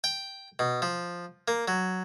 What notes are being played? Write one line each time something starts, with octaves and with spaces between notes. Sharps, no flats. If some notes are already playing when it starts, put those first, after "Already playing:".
G5
B2
F3
A#3
F#3